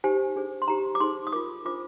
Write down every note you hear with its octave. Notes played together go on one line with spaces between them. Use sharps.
D#4 G4 C5 G#5
D4 G#4 C5
C6
D#4 G4 C5 A#5
D6
D#4 G#4 C5 C6
D#6
F4 A#4 D6
D4 F4 C5 D6